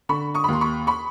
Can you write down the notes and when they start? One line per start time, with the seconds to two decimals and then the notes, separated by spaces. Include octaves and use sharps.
0.09 D3 B5 C#6
0.35 C#6 D#6
0.44 B5
0.48 D#2 C6
0.61 B5 C#6
0.87 B5 C#6